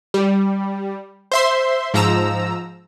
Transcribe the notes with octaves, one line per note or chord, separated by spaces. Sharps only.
G3
C5 E5 C6
G#2 F3 A#5 E6